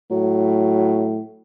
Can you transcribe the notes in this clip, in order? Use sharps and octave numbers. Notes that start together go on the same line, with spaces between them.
A2 F#3